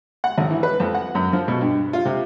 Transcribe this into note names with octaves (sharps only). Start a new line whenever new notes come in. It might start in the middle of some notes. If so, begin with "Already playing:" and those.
F#5
G#1
E3
B4
F2
F#5
F#2
F3
B2
G2
F4
C3